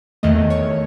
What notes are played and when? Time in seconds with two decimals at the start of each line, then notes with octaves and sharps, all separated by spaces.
0.23 E2 D#3 A3 D#5
0.50 C#5